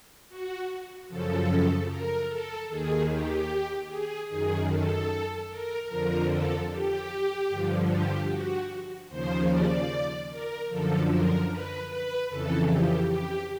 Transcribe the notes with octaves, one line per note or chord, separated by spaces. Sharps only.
F#4
F#2 C#3 F3 A4
A#4
A4
D#2 D#3 G#4
G4
G#4
F#2 D#3 G#4
A4
A#4
F2 D3 F3 A#4
A4
G4
G2 D3 F3
G4
F#4
D#2 C#3 F3 C5
D5
A#4
F#2 D3 F3 A4
A#4
B4
B4
F2 C#3 E3 A4
G4
G4